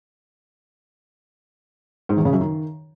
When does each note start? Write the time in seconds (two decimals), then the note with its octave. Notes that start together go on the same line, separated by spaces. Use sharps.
2.09 G#2
2.17 E2
2.25 C#3
2.33 F#2
2.41 D#3